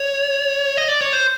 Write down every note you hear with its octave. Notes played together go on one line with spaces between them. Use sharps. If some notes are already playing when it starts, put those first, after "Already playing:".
Already playing: C#5
D#5
D5
C#5
C5